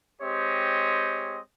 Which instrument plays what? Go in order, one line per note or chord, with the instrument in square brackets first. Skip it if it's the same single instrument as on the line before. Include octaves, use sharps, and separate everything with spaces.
[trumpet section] G#3 C4 G4 C#5 D#5